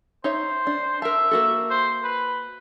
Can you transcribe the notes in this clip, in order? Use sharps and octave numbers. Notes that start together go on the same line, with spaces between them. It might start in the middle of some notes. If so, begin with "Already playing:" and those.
D#4 C5 C#5 E5
D4
A#4 E5 A5
A#3 F#4 A4
C5
B4